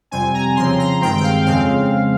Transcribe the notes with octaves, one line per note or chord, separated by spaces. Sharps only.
F2 C3 G3 C4 G#5
A#5
C#3 F3 C4 C6
A#5
G2 D#3 G#3 C4 G5
G5
F5
F2 C#3 G#3 C4 F5